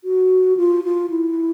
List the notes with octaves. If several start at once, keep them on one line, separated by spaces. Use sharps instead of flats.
F#4
F4
F4
E4